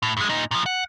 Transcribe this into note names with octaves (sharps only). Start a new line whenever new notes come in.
A2
G2 G#3
A#2 D#4
A#2 F3
F#5